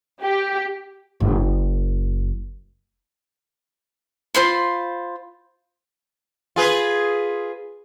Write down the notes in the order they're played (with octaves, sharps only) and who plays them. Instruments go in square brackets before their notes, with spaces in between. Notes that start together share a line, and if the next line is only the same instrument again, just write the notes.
[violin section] G4
[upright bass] F#1 A#3
[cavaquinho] F4 C5 B5 C6
[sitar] F4 G#4 B4